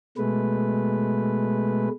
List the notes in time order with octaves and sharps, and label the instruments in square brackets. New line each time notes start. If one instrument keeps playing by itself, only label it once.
[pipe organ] B2 G#3 A3 B4